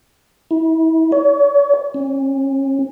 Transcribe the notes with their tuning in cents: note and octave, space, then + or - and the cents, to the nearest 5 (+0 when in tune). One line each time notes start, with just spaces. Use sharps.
E4 -35
C#5 +40
C#4 -35